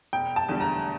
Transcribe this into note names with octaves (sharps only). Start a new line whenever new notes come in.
E1 G5
A5
E2 D3 G3
A#5